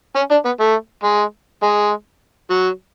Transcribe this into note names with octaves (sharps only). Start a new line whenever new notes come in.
C#4
D4
B3
A3
G#3
G#3
F#3